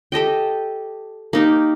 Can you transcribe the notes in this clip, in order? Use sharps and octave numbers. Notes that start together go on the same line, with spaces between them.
G4 A4 D#5 G5
A#3 D#4 G4